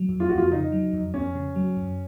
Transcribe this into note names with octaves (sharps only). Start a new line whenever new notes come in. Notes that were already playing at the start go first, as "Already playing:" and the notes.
Already playing: F#3
F2
F4
F2 F#4
F4
C#3 D#4
F#3
F2
F2 C#4
C#3
F#3
F#2